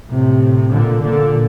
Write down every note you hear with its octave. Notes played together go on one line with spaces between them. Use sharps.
A2 C3
A#2 D3
A#2 D3